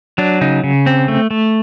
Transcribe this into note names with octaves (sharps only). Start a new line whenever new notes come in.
F#3 D4
C#3 D#4
C#3
C4
A3
A3